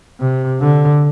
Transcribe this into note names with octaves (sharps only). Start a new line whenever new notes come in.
C3
D3